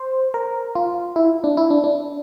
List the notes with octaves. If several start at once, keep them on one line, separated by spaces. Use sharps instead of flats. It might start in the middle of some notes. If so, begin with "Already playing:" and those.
Already playing: C5
A#4
F4
E4
D4
E4
D4
D4